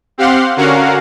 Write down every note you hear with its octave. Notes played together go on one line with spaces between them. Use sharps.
C4 G4 F5 F#5 C6
D3 C#4 F#4 A#4 F5 F#5